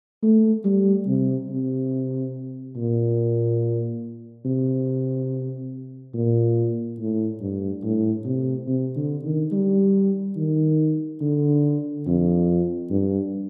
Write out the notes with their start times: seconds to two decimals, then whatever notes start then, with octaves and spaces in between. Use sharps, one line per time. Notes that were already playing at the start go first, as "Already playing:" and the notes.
0.23 A3
0.65 G3
1.07 C3
1.50 C3
2.76 A#2
4.45 C3
6.14 A#2
6.99 A2
7.41 G2
7.84 A2
8.25 C3
8.67 C3
8.96 D3
9.24 D#3
9.52 G3
10.37 D#3
11.21 D3
12.06 F2
12.90 G2